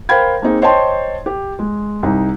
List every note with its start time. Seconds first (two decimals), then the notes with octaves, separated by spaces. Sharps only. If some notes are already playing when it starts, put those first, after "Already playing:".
0.09 A#4 C5 F5 G5 B5 G#6
0.42 A#3 C4 D#4 G#4
0.62 C5 C#5 D#5 G5 A5 C6
1.26 G4
1.59 G#3
2.03 C2 D#4